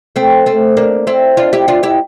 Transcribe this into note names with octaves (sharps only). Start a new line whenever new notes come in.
A3 C4
A3 C4
A#3 D4
C4 E4
D4 F4
E4 G4
D4 F4
E4 G4